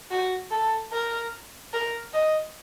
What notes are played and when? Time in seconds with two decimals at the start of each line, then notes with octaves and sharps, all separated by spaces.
0.11 F#4
0.51 A4
0.92 A#4
1.73 A#4
2.13 D#5